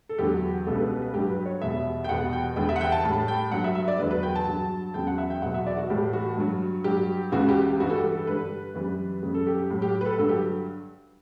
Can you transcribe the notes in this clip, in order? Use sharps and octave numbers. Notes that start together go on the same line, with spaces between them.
A4
E2 D3 F#3 G4
C#2 B2 G3 A4
B4
B4
B4
G2 F#3 G4
B4
C#5
E2 B2 G3 E5
G5
E2 B2 G3 F#5
G5
E2 D3 G3 G5
E5
F#5
G5
A5
A2 G3 A5
G5
G2 F#3 F#5
E5
E5
D5
E2 D3 F#3 B4
B4
G5
A5
G2 F#3
E2 C#3 F#3 G5
F#5
E5
G5
E2 B2 F#3 F#5
E5
D5
F#4
A2 E3 G3 G4
F#4
G2 F#3
G2 F#3 G4
C#2 C#3 E3 G3 F#4
G4
G4
G2 E3 G3 F#4
A4
G4
A4
G2 D3 G3 B4
F#2 E3 G3
F#2 C#3 G3
A4
G4
G4
A2 F#3
G4
B4
A4
G2 D3 F#3 A4
G4